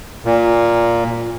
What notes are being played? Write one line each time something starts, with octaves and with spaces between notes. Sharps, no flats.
A#2